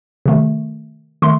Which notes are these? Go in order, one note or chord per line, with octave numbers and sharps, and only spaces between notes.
C3 D#3 A3
D#3 A3 C6